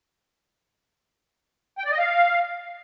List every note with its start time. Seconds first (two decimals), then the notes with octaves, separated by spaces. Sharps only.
1.78 G5
1.85 D5
1.92 D#5
1.99 F5